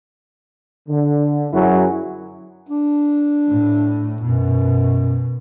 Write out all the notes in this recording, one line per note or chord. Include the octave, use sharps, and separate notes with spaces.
D3
F#2 F#3 E4 F#4 G#4
D4
A2
F#2 B2